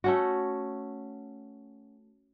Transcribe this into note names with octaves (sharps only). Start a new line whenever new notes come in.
A3 C#4 F#4